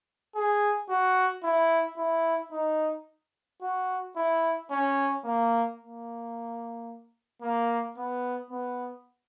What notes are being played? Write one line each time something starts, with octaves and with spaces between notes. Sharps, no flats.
G#4
F#4
E4
E4
D#4
F#4
E4
C#4
A#3
A#3
A#3
B3
B3